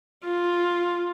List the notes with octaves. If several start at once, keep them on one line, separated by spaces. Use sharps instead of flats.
F4